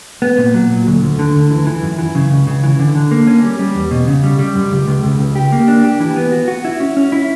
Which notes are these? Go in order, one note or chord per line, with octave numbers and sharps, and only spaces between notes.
B3
A#2
F#3
A#2
D2
D2
D3
D2
E3
E3
F#2
E3
C#3
C#2
C#3
E3
D3
D3
A#3
C#4
G3
G3
E2
B2
C#3
G3
G3
F#2
C#2
C#2
C#2
C#2
G4
A#3
D4
G4
E3
B3
F#4
F#4
E4
C#4
C#4
E4